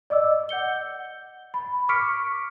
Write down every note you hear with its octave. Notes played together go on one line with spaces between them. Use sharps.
D5 D#5 D6 E6
F#5 G6 C#7 G7
B5
C#6 D6 F6 B6 C#7 D7